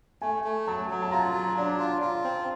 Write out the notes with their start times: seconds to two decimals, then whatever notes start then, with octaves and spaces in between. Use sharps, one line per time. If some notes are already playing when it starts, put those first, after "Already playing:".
0.22 A3 G#5
0.44 A3
0.67 F#3 A5
0.90 F#3
1.02 A5
1.11 F4 A#5
1.34 F#3
1.57 D4
1.79 F4
2.02 F4
2.24 C4